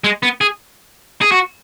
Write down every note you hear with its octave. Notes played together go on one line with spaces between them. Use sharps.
G#3
B3
G#4
G#4
F#4